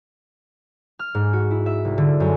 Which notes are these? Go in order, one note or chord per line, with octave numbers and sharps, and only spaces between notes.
F6
G#2
F#4
E4
E5
C2
D3
F#2